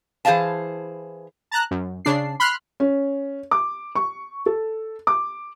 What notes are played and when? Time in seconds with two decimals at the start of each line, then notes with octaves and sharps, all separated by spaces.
0.25 E3 G#4 C5 D#5 F5 A5
1.51 A5 A#5 F#6
1.71 F#2
2.05 C#3 D4 C7
2.40 B5 C6 F6 F#6
2.80 C#4
3.51 D6
3.95 C#6
4.46 A4
5.07 D6